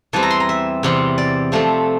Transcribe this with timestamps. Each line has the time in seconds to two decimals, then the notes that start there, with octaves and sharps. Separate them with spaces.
0.13 E2 E3 G3 C4 A5
0.23 A#5
0.30 C6
0.40 A#5
0.49 E5
0.83 E2 C3 G3 C4
1.18 D5
1.52 C3 F3 A3 C4